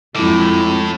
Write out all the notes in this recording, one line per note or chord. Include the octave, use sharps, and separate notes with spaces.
F2 A2 G#3 E4 D6